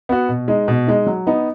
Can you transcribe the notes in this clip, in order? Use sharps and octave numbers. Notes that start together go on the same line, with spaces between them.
B3 F#4
B2
G#3 D#4
B2
G#3 D#4
F#3
B3 D#4